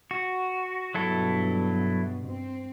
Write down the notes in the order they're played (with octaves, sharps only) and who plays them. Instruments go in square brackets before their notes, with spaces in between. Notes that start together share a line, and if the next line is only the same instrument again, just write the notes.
[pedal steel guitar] F#4
[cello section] G2 B2 [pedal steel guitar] F#3 E4 A4
[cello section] C4